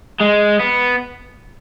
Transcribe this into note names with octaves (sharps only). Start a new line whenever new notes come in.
G#3
B3